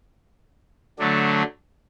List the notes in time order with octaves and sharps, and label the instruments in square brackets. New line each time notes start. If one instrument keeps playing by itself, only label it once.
[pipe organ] D3 F#3 A3 D4